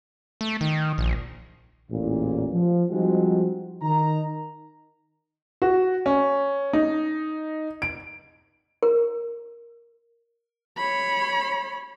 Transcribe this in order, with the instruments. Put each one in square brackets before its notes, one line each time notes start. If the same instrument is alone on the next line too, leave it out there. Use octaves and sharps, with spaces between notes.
[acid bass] A3
D#3
A#1
[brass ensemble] A1 E2 A#2
F3
F3 G3 G#3 C4 D#4 F#4
D#3 D#4 A#5
[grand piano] F#4
C#4
D#4
D7
[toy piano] A#4
[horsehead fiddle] C#5 B5